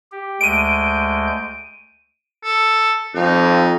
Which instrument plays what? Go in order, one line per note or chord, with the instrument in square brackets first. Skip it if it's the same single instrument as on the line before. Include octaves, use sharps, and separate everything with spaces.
[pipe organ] G4
[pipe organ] D2 G#3 G6 [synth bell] D7 D#7
[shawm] A4
[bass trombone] F2 [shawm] D#4